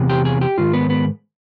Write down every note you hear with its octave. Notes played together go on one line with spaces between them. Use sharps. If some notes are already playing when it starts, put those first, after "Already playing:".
Already playing: E2 C3
G4
G#4
G4
G#2 D#3 F4
B3
B3